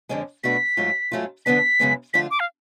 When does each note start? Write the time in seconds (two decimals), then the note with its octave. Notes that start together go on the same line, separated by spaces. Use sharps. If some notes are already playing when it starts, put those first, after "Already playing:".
0.09 F2 D3 G#3 C#4
0.43 B2 A3 D4 F#4 B4 B6
0.77 G#2 F#3 A3 F4
1.12 G#2 F#3 A3 C#4 F4
1.45 D3 F3 B3 D4 B6
1.80 F#2 C#3 G#3 B3
2.13 D3 F3 A3 F4 B6
2.31 D6
2.40 F5